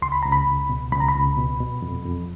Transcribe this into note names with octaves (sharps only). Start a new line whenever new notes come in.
C#2 C6
B5
C#2 A#5
B5
C#2
B2
C#2 B5
A#5
B5
C#2
B2
B2
F2
F2